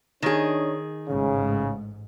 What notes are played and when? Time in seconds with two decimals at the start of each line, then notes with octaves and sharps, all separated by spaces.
0.22 D#3 D4 D#4 G#4 C#5
1.08 A1 G#2 C#3